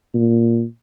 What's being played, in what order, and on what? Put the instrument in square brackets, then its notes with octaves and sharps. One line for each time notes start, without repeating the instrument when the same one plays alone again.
[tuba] A#2